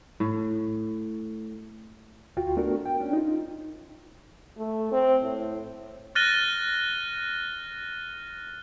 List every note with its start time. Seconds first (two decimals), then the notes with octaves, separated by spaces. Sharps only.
0.20 A2
2.37 D2 F4 F#4 G5
2.57 A3 B3 D4 F#4 A#4
2.86 G5
3.00 C#4 D4
3.13 D#4 F4
4.58 A3
4.92 C4
5.23 A2
6.15 F6 F#6 A6 A#6 D#7 G7